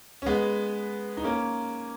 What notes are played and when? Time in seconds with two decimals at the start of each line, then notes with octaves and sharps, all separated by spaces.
0.22 C#4
0.26 G#3 B3
1.17 D#4
1.23 A#3 C#4